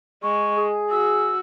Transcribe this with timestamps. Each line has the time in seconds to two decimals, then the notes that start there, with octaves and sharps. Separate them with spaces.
0.23 G#3 C#6
0.57 G#4
0.91 F#4 E6